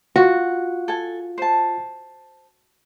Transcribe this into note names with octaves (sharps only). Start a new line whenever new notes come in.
F4 F#4
A4 G#5
C5 A5